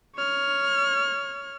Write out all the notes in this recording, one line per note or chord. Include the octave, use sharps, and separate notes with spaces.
C#5 F6